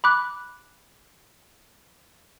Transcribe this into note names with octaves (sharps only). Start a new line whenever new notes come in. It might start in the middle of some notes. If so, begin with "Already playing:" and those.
B5 D6 F#6